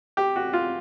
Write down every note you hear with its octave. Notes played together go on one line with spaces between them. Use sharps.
G4
F#4
F4